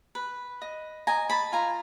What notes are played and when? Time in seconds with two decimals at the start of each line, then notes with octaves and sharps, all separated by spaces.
0.15 B4
0.62 D#5
1.07 D#5 G#5 A#5
1.30 A5 B5
1.52 F4 G#5 A#5